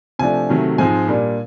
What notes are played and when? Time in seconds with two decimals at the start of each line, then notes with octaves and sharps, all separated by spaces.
0.19 C3 F3 A3 D4 G#5
0.50 C3 D#3 F#3 A3
0.78 G#2 F3 G#3 C4 G#5
1.08 A#2 G3 A#3 D4